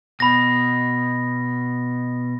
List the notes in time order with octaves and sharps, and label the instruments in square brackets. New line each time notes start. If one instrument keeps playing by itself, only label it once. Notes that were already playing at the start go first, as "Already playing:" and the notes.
[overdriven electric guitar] B2 [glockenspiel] B5 A#6